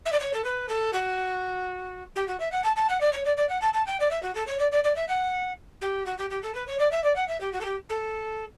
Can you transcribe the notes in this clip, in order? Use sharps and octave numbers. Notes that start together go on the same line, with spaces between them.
E5
D5
C#5
A4
B4
A4
F#4
G4
F#4
E5
F#5
A5
A5
F#5
D5
C#5
D5
D5
F#5
A5
A5
G5
D5
E5
F#4
A4
C#5
D5
D5
D5
E5
F#5
G4
F#4
G4
G4
A4
B4
C#5
D5
E5
D5
F#5
E5
G4
F#4
A4
G4
A4